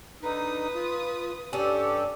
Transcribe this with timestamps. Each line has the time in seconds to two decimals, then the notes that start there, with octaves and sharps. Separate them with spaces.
0.22 D3 D#4 B4 D#6
0.75 F4
1.53 G2 C#4 D4 G4 A4